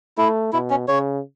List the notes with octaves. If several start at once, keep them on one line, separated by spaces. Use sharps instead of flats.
A3 E4
B2 E4
C#4
C#3 C#5